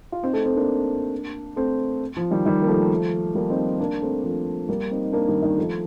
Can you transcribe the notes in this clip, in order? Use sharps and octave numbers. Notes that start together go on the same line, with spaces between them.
F4
C4 D#4
A3 C4
A3 C4
A#3 D4
A3 C4
F3
D#3 G3
D#3 G3
A#3
F3 A3
G3 A#3
C4 D#4
A#3 D4
A3 C4
F3 A3
G3 A#3
C4 D#4
D#4
A#3 D4
D#3 G3
D#3 G3
F3 A3